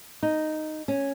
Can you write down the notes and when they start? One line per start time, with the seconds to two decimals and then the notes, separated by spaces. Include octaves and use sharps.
0.23 D#4
0.88 C#4